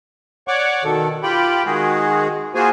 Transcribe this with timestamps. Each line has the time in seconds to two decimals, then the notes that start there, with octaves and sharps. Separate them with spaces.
0.48 C#5 D5 F#5 C#6 D6
0.84 B2 D#3 A4
1.23 F4 G4 G5 B5
1.65 D#3 G#3 F#4 G#4
2.55 A#3 F4 F#4 G#4 C5 G#5